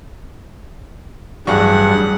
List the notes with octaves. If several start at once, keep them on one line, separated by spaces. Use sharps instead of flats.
A1 G2 F#3 G3 G#4 F#5 C#6